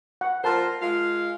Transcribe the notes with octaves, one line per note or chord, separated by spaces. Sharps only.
F#5
F3 F4 A#4 C5 A5 C6
G#3 F4